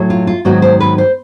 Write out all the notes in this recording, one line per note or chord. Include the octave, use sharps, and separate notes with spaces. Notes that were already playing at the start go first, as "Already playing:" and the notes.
Already playing: A2 F#3 A3
F4
F4
G#2 D#3 F#3 B3 F#4
C5
B4
C5